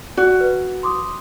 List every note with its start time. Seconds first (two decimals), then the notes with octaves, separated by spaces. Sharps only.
0.17 F#4 D5
0.41 B4
0.83 C6 D6 D#6